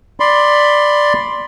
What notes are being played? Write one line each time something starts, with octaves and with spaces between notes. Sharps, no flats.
D5 B5 C6